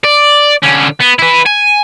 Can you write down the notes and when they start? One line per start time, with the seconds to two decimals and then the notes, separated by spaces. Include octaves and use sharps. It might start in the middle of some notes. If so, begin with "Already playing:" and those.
0.04 D5
0.63 D3 C#4
1.01 B3
1.19 E4 B4
1.46 G#5